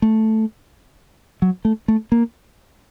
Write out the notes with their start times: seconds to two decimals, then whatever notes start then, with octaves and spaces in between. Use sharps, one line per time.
0.02 A3
1.42 F#3
1.65 A3
1.88 A3
2.12 A#3